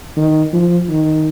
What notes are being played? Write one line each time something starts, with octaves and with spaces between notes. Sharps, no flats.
D#3
F3
D#3